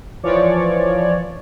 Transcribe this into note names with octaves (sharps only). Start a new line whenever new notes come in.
E3 F3 C#5 D5